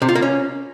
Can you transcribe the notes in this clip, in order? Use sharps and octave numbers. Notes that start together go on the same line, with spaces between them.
C3
F4
A#3
C#4